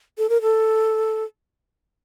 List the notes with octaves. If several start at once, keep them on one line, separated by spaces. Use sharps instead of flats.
A4
A#4
A4